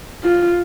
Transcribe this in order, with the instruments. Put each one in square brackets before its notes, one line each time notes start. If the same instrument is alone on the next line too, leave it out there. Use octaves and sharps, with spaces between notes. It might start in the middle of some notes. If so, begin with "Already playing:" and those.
[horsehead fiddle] F4